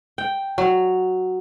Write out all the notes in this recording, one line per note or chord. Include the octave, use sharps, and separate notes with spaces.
G5
F#3